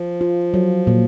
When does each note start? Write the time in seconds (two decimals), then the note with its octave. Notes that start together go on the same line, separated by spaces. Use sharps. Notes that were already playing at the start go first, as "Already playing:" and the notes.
Already playing: F3
0.21 F4
0.54 F#3
0.87 A#2